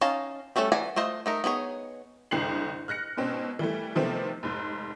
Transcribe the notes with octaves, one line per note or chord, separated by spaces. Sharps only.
C#4 D#4 F5 A5 A#5
G3 A3 C#4 A4
E3 D5 F#5 G#5 A#5
A3 F4 C5 D#5
A3 D#4 A#4
B3 D#4 G#4 C#5
F#1 C2 D3 G5 C7 F#7
F6 F#6 A#6 C#7
G#2 B2 C4 C#4
E3 G3 A3
C3 D#3 F3 A3 B3 C4
F1 G#2